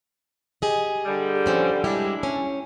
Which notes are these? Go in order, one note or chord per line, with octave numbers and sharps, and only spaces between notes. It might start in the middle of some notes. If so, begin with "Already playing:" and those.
G4 G#4 D#5
D3 G3
F3 C4 C#4
G3 G#3 D4 E4 G4
C#4